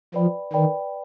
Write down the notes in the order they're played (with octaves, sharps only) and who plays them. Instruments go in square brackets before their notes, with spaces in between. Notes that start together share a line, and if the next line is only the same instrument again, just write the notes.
[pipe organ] F3 [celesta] B4 D5 G5 B5
[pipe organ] D#3 [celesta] B4 D5 G5 B5